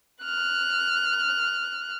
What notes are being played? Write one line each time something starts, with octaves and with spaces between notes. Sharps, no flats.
F6 F#6